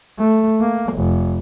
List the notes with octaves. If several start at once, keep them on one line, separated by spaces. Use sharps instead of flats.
A3
A#3
F1